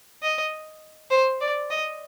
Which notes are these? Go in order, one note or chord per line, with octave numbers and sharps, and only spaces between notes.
D#5
C5
D5
D#5